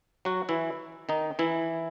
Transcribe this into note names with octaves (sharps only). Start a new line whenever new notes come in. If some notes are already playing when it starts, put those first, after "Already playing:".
F#3 F#4
E3 E4
D#3 D#4
E3 E4